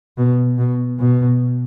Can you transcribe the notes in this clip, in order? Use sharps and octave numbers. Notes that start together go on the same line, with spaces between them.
B2
B2
B2